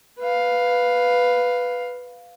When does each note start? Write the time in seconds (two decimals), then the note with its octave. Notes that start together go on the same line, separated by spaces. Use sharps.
0.19 B4 F5